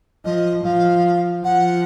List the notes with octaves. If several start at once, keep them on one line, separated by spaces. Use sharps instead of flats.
F3 D#5
F3 F5
F3 F#5